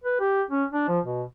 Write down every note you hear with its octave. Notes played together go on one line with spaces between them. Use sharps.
B4
G4
C#4
D4
F3
B2